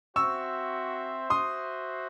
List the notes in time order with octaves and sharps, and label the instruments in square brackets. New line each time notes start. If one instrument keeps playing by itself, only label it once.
[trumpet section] C4 F#4 C5 E5 [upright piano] C#6 E6
[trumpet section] F#4 C5 E5 [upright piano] C6 D#6